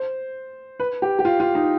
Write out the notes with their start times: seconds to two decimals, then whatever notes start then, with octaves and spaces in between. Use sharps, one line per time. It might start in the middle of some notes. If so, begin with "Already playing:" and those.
Already playing: C5
0.80 B4
1.02 G4
1.19 G4
1.25 F4
1.40 F4
1.55 D#4